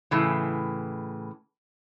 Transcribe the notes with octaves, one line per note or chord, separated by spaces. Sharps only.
A2 C#3 E3